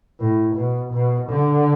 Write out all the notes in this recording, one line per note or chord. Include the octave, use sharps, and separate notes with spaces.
A2
B2
B2
D3